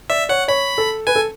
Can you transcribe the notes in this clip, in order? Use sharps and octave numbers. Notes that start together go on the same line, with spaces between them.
D5 E5
C#5 F#5
C#5 B5
A4
B4 G#5
A4